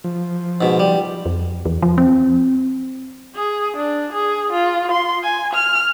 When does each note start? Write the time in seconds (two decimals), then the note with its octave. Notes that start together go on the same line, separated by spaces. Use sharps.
0.04 F3
0.61 G#2 B2
0.79 G3
1.26 F2
1.65 E2
1.82 F3
1.98 C4
3.35 G#4
3.77 D4
4.13 G#4
4.53 F4
4.91 C6
5.24 G#5
5.54 F6